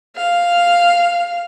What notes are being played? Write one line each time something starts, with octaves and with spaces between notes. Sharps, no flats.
F5